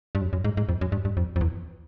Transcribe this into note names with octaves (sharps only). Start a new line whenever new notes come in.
G2
F#2
F#2
G#2
G#2
F2
F#2
G2
G2
F2
F2
E2